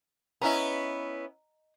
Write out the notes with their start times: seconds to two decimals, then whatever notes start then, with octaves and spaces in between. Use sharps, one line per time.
0.41 B3 C#4 E4 D#5 A#5